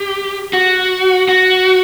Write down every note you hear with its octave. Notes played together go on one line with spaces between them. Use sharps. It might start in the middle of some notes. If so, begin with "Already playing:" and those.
Already playing: G4
F#4
F#4